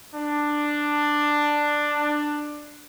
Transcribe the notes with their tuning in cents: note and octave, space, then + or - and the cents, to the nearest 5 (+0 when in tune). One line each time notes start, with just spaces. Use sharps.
D4 +10